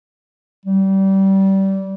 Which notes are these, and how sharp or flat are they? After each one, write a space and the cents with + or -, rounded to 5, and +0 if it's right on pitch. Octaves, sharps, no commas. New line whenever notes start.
G3 -25